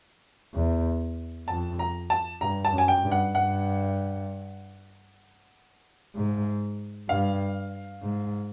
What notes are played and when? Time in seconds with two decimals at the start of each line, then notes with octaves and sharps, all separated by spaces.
0.54 E2
1.48 F2 A5
1.79 A#5
2.10 A5
2.41 G2 A#5
2.65 A5
2.73 F#2
2.78 G#5
2.88 G5
3.04 G2
3.12 F#5
3.35 G2 F#5
6.15 G#2
7.09 G2 F5
8.03 G#2